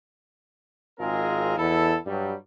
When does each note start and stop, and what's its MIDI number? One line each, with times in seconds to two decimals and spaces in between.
1.00 1.55 32
1.00 1.55 56
1.00 1.55 60
1.00 1.55 65
1.00 1.55 68
1.00 1.55 70
1.58 1.96 40
1.58 1.96 47
1.58 1.96 64
1.58 1.96 69
2.07 2.33 43
2.07 2.33 54
2.07 2.33 55